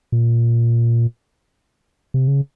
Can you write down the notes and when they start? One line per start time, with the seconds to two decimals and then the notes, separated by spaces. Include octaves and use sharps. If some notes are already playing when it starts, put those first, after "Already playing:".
0.12 A#2
2.14 C3
2.28 C#3